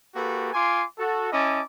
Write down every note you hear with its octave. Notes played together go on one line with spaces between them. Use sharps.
A#3 F#4 G4 A4 B4
F4 G#5 C6 D6
F#4 A4
C#4 E4 D#5 A5 D6